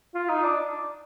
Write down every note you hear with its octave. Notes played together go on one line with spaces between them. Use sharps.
F4
D#4
D4